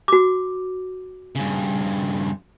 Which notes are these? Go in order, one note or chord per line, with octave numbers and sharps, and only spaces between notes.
F#4 D6
G2 C#3